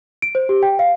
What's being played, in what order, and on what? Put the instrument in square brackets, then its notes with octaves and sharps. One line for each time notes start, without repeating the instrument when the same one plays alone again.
[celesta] D7
C5
G4
G5
F5